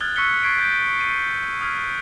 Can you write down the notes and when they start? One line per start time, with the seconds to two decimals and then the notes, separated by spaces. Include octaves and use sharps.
0.01 D#6 F6 F#6 G#6 A6 G7
0.16 C#6 E6 F#6 B6 C#7 G7
0.43 C#6 G#6 B6 C7 D7
0.58 G6 A6 B6 D7
1.00 B6 D#7
1.61 D#6 F6 G#6 B6